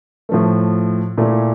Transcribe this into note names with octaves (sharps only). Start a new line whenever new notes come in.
A2 F3 A3
A#2 A3 E4